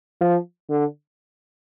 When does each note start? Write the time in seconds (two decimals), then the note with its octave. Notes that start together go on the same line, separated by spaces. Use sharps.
0.21 F3
0.70 D3